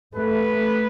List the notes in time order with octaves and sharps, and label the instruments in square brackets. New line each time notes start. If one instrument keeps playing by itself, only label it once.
[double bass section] A3 [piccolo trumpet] B4